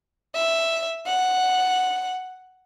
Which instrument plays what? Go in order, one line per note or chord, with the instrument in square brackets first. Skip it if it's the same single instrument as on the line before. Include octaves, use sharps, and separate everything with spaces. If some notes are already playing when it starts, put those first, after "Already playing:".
[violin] E5
F#5